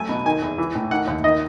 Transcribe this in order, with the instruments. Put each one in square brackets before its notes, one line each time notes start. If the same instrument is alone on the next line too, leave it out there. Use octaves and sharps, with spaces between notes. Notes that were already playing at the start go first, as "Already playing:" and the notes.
Already playing: [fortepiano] F#2 A3 G#5
B2
D#3 G#5
E2
E3
A2
D#3 F#5
D#2
D#3 D#5